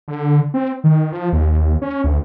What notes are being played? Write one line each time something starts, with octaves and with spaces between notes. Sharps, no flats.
D3
C4
D#3
F3
D#2
C#4
D2